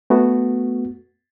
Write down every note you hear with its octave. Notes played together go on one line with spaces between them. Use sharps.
A3 B3 F#4